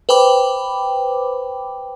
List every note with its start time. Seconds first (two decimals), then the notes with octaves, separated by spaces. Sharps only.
0.09 B4 C5 G5 B5 D6